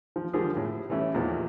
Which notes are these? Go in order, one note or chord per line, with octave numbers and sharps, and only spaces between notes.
F3
D3 F3 G3 A#3 G#4
A2
E3 G3 A3 C#4 E4
E2 A#2 D#3 F3